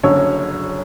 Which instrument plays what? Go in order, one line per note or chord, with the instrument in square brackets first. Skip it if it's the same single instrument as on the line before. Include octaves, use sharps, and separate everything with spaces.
[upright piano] F#1 F#2 D3 C#5